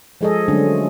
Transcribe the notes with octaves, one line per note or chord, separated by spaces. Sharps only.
F3 G#3 G#4 A4 D#5
D3 F#3 G#3 A3 C#4 D4